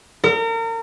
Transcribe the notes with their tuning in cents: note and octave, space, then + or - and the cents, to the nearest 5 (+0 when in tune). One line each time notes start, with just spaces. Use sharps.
A#4 -35